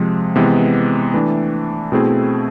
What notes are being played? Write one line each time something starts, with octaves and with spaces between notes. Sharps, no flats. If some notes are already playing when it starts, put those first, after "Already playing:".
Already playing: C3 F3 G#3
C3 E3 G#3 B3
E3 A3 D4
B2 A3 C4 E4 G#4